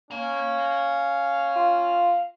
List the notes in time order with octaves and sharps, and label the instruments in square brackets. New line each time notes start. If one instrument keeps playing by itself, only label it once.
[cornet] C#4 [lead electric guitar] F5 A#5
[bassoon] F4